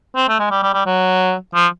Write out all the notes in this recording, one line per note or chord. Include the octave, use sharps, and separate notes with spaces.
C4
A3
G#3
G3
G3
G3
F#3
F3